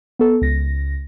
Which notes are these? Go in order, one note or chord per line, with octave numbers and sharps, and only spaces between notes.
B3 A4
C#2 A#6